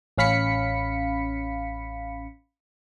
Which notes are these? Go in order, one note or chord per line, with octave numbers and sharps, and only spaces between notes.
A1 C#4 F5 B5 B6 C#7